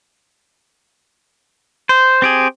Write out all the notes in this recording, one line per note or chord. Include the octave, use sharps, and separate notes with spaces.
C5
C4 G4 G#4